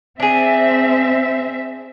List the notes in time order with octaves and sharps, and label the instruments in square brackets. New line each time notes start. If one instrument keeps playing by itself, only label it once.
[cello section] C4 E5 [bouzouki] D4 G#4